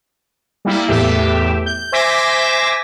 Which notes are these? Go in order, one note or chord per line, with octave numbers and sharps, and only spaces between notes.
G3 A#3 E4
E2 A2 G4 E5
G6
C5 E5 G#5 D6 A#6 B6